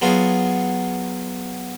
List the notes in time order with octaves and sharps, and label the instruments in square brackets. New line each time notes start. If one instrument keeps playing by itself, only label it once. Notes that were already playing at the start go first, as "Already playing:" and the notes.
[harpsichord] F#3 B3 F4 F#4 G#4